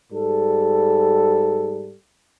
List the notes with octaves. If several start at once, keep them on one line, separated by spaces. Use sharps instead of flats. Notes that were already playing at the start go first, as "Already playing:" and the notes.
G#2 G3 A4